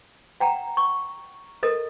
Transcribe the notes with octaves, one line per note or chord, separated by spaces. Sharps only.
F#5 G5 A#5
C#6
A4 A#4 D#5